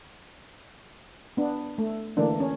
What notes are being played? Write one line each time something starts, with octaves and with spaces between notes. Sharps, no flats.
B3 D4
A3
D3 E3 A3 A#3 D4
C#4